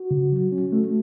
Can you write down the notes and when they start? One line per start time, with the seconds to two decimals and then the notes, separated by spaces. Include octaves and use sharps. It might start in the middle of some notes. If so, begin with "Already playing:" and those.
Already playing: F#4
0.11 C#3
0.32 F#3
0.52 C#4
0.72 A3